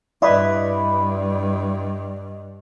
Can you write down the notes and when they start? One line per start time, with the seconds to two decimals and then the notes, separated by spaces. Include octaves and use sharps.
0.22 G2 E4 B4 D5 D#5